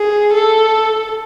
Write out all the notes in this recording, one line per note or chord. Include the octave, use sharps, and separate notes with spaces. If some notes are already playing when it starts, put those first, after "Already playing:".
Already playing: G#4
A4